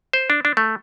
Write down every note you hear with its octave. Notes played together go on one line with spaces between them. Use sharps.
C5
D4
D4
A3